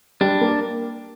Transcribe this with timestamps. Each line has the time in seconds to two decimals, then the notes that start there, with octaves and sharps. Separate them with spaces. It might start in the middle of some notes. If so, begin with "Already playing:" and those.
0.21 G3 D4
0.41 A#3